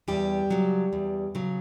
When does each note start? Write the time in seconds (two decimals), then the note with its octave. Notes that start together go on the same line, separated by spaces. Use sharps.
0.08 E2 G3 G4
0.51 C#3 F#3
0.93 E2
1.35 C#3 F#3